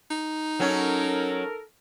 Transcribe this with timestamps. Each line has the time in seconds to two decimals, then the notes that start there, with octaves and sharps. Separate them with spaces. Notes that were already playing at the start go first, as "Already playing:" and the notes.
0.10 D#4
0.60 F#3 C#4 A4 A#4